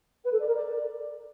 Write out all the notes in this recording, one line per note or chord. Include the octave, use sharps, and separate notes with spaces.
B4
A4
D5
A#4
D5